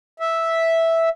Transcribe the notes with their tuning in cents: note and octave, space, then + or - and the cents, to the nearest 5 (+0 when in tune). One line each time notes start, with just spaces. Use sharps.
E5 -5